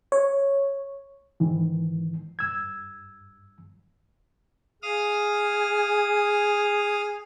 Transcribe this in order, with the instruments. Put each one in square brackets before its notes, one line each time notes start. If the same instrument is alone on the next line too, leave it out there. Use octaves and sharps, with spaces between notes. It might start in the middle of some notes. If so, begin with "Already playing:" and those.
[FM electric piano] C#5
[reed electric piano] G#2 D#3 E3
G2 E6 G#6
[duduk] G#4 [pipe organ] F5 D#6 F6